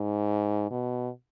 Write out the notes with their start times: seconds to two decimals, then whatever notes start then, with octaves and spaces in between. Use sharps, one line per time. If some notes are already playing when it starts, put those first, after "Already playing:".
Already playing: G#2
0.71 B2